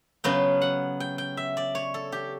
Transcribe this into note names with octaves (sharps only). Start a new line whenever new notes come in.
C#3 F#3 B3 G5
F#5
G5
G5
E5
D5
C#5
A4
G4